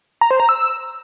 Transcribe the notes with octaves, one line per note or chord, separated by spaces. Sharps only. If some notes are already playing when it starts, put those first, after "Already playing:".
A#5
C5
A#5
E6